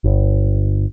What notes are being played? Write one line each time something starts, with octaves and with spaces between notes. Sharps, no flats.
G1